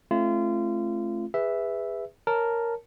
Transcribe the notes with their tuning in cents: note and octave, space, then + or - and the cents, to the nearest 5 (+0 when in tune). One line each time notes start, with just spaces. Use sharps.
A3 -25 C4 +35 F4 -30
G#4 -30 B4 +0 E5 +0
A#4 +0 C#5 +0 A5 +0